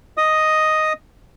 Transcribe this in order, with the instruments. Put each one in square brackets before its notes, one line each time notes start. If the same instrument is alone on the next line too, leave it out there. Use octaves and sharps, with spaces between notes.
[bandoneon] D#5 D#6